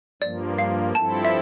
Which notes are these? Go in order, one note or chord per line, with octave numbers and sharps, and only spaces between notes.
G2 F3 A#3 D5
F5
G2 F3 C4 E4 A4 A5
E5